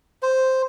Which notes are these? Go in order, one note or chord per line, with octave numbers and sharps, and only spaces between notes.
C5